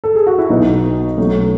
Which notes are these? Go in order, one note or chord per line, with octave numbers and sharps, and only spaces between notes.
A4
G#4
F#4
E4
B1 B2 F#3 B3 D#4
B1 B2 F#3 A3 C#4